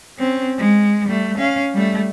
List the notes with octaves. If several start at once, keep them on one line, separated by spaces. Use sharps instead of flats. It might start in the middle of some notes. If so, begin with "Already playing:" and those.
C4 C#4
G#3
G3 A3
C#4 F5
G3 A3